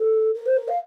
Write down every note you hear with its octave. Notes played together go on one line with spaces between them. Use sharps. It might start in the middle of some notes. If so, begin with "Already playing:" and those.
Already playing: A4
A#4
C5
A#4
F5